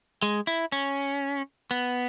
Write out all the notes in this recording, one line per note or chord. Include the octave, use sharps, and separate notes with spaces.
G#3
E4
C#4
B3